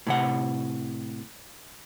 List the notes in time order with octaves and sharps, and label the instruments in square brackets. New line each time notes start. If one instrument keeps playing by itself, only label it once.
[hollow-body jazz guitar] A2 C3 F#5